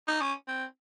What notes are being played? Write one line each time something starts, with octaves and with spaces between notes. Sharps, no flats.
D#4
C#4
C4